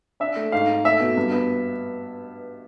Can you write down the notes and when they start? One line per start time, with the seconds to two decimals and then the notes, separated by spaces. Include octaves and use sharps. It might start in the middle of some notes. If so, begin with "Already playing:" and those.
0.20 D4 E5
0.36 A3
0.52 G#2 F5
0.68 G#2
0.84 A3 E5
1.00 B2
1.17 G2
1.32 B3